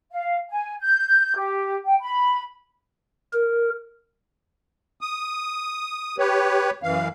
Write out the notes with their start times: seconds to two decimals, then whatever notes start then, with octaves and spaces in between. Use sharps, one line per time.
0.11 F5
0.50 G#5
0.81 G6
1.36 G4
1.85 G5
2.00 B5
3.33 A#4
5.01 D#6
6.18 G4 B4 C#5
6.83 F#2 E3 F5